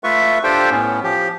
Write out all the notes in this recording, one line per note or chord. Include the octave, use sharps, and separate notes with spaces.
A3 F4 B4 E5 C#6
D4 F4 G4 A4 C5 G5
A2 B3 C#4
F3 G4